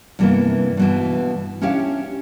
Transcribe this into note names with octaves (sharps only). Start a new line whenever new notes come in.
G2 C3 E3 G3 A#3 B3
G2 B2 E3
C#4 D4 E4 G4 C#5 F5